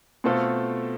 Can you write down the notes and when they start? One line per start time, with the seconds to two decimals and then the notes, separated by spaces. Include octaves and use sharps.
0.24 B2 A3 C4 F4 A4